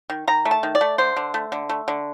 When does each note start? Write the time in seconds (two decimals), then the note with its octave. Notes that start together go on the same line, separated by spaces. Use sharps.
0.10 D#3
0.28 D#3 A#5
0.45 A3
0.51 A5
0.63 D#3
0.75 D5
0.81 A3
0.98 D3 C5
1.17 D3
1.34 A3
1.52 D3
1.69 A3
1.88 D3